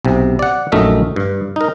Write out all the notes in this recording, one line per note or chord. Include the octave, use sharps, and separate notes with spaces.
B1 C3
D5 F#5
A#1 F#2 A3 D#4 A#4 E5
G2
D#4 A#4